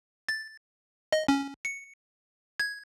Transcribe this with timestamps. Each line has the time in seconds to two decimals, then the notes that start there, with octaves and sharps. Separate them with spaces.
0.29 A6
1.12 D#5
1.28 C#4
1.65 C#7
2.60 G#6